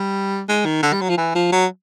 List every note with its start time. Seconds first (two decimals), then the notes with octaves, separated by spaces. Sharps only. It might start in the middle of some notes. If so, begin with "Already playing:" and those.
Already playing: G3
0.49 G#3
0.66 D#3
0.83 D3
0.93 G3
1.01 F#3
1.09 F3
1.18 E3
1.35 F3
1.52 F#3